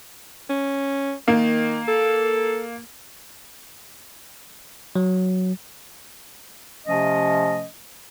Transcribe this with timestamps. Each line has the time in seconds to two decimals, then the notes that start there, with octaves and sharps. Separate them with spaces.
0.50 C#4
1.28 D#3 A#3
1.88 A4
4.96 F#3
6.86 C3 F3 A3 C#4 D#5